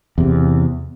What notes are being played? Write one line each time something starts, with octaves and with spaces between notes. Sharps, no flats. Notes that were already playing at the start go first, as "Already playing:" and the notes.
E2 C3